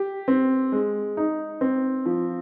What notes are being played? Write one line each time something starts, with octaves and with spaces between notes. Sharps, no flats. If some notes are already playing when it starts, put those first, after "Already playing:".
Already playing: G4
C4
G#3
D#4
C4
F3